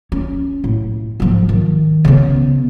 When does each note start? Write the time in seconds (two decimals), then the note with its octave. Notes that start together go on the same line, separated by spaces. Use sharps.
0.12 C#4
0.64 A2
1.20 G#2 F3
1.49 D#3
2.05 C#3 B3